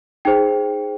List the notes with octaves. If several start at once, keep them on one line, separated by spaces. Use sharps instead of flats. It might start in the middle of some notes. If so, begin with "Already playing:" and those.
D#4 G#4 C5 G5